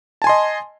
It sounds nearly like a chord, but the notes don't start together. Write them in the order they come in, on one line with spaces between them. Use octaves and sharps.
A5 G#5 C6 D#5